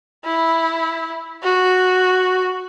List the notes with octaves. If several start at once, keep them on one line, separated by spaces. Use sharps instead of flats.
E4
F#4